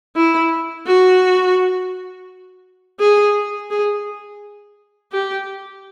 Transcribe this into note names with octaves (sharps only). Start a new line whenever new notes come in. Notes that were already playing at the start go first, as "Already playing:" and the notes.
E4
F#4
G#4
G#4
G4